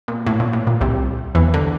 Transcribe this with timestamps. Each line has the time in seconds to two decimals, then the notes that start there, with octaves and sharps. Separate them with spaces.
0.08 A#2
0.27 A2
0.40 A#2
0.53 A2
0.67 A#2
0.81 C2 C3
1.35 E2 E3
1.54 D3